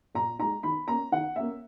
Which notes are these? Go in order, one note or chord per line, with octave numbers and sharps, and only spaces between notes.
A#2 A#5
G#3 D#4 A#5
D#3 B5
A#3 C#4 A#5
D#3 F#5
A#3 C#4 E5